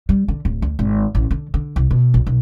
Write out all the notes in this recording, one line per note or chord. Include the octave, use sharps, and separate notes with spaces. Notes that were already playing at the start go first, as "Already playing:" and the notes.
G3
D3
D1
D2
G#1
A1
D3
D3
C2
B2
A#1
B1